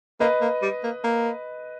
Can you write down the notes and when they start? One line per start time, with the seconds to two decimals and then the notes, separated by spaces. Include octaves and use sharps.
0.20 A#3 B4 D#5
0.41 A#3
0.62 G3
0.83 A#3
1.04 A#3